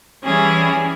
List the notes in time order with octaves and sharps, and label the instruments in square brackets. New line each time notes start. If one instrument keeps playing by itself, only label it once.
[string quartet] E3 G3 C#4 E4 G#4